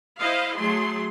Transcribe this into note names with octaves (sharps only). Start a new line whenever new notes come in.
E4 C5 D#5 F5
F#3 A3 G#4 C6